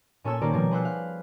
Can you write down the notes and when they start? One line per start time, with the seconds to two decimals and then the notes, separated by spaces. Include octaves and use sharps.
0.24 A#2 C#4 A4 C#5 E6 G#6
0.41 D#3 A#3 G4 A#4 C5 D5
0.53 B2 F3 G3 A#4 G#6
0.71 G#4 B4 C5 F#5 E6 F#6
0.85 F5 F#6